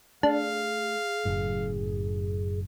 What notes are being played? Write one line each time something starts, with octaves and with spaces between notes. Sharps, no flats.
A3 D4 G#4 F5
F#1 F#2 A2